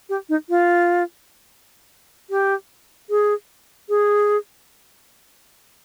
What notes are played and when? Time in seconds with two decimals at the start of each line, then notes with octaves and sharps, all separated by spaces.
0.09 G4
0.29 D#4
0.49 F4
2.30 G4
3.10 G#4
3.89 G#4